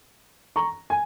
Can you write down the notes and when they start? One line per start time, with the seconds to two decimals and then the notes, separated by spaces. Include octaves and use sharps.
0.56 A#5 C#6
0.90 G#5